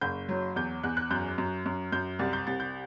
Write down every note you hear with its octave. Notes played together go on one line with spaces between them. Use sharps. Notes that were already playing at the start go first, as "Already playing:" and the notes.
F#1 G6
F#3
E2 G6
E2 F#6
F#6
F#2 G6
F#2
F#2
F#2 G6
C2 A6
G6
C2 A6
G6